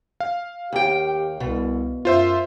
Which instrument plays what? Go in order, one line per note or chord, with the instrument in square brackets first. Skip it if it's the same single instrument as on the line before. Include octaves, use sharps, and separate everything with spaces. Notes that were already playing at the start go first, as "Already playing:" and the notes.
[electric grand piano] F5
[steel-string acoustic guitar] D#2 G5 [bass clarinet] G4
[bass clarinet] C2 [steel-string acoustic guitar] B2
[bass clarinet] F#2 [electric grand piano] F4 C5 E5